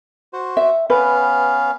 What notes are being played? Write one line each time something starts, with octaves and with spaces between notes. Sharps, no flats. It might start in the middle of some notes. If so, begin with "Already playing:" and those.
F#4 C5
E5
B3 C#4 B4 F5